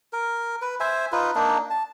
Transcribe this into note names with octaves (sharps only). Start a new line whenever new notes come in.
A#4
B4
C5 E5 G#5
D#4 F4 B4
A#3 D4 D#4
A5